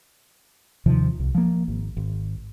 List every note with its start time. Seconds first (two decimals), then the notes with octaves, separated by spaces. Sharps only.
0.86 D#2 C3 D#3 F3
1.20 C2
1.35 F3 A#3
1.68 G#1
1.97 G#1